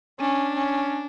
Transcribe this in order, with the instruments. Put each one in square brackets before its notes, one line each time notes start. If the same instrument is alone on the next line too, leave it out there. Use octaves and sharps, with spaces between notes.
[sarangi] C#4 [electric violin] D4
[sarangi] C#4